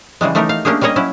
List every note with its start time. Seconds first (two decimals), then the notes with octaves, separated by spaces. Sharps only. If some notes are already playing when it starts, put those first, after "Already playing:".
0.21 C#3 E3 G3 G#3
0.35 E3 A3 D#4 G4 A#4
0.49 F5
0.65 A3 A#3 C#4 D4 G4 G#4
0.81 G3 A#3 C#4 C#5 D#5
0.96 F#3 C#4 E4